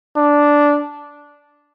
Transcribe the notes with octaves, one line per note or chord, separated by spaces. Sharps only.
D4